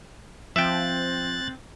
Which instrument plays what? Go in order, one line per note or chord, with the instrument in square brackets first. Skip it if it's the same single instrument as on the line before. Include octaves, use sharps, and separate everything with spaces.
[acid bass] F3 [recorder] C4 [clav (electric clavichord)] E5 G5 [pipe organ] F#6 A6